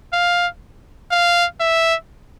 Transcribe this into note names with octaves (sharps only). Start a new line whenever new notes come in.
F5
F5
E5